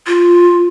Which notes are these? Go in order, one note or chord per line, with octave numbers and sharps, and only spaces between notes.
F4